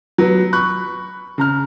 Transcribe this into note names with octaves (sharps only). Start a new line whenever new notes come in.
F#3 B3
B5 C#6 F#6
C#3 A#5 F6